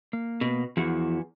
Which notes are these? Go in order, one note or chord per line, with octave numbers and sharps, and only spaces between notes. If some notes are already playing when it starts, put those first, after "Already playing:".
A#3
B2
E2 F3 E4 F#4